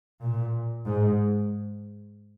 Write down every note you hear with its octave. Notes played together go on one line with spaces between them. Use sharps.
A#2
G#2